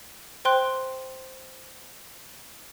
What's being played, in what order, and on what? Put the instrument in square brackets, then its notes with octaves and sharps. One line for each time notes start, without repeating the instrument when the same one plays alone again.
[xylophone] C5 G5 C6 F#6